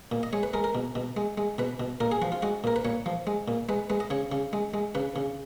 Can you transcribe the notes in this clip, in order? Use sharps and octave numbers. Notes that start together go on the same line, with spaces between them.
A#2
D#5
G#3 C#5
B4
G#3 A#4
A#4
B2
B2
G#3
G#3
B2 B4
B2
A#2 A#4
G#4
F3 F#4
F4
G#3 F#4
A#2 A#4
B4
A#2 C#5
F3
G#3
A#2
G#3 B4
G#3 B4
D#5
C#3 C#5
C#3
G#3
G#3
C#3 B4
C#3